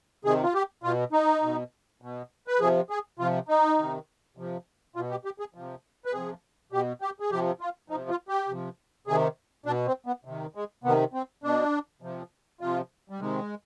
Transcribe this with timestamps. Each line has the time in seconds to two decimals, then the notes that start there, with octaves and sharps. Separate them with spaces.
0.25 C3 D#3 G#4
0.43 F4
0.54 G4
0.83 B2 F4
1.12 D#4
1.43 B2
2.02 B2
2.48 B4
2.60 C3 F3 G#4
2.90 G#4
3.19 C3 F3 F4
3.49 D#4
3.78 C3 D#3
4.37 C3 F3
4.96 B2 F4
5.11 G4
5.25 G4
5.40 G#4
5.54 C3 F3
6.05 B4
6.13 C3 F3 G#4
6.72 B2 G4
7.01 G4
7.20 G#4
7.31 C3 F3 G4
7.61 F4
7.90 F3 D#4
7.94 C3
8.10 F4
8.29 G4
8.49 C3 F3
9.07 C3 D#3 G#4
9.66 B2 D4
9.87 C4
10.06 B3
10.25 C3 D#3
10.55 G#3
10.84 C3 D#3 B3
11.14 C4
11.44 B2 D4
12.02 C3 F3
12.61 C3 F3 F4
13.10 G3
13.19 C3 D#3 G#3